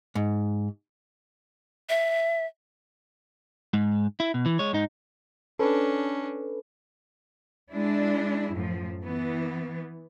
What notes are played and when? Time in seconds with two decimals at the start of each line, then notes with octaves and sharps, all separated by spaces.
0.15 G#2
1.89 E5
3.74 G#2
4.20 E4
4.34 B2
4.46 E3
4.59 G#3 C#5
4.73 G#2 D#4
5.59 C#4 D4 A4 B4
7.73 G#3 D4 E4
8.53 F#2 A2 F3
9.03 E3 B3